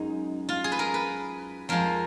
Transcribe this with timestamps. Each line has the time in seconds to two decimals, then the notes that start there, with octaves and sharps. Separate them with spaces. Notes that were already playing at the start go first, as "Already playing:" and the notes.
Already playing: F#2 G#3 D#4
0.49 F4
0.64 G#4
0.72 B4
0.79 A#4
0.94 B4
1.69 F2 F3 G#3 A#4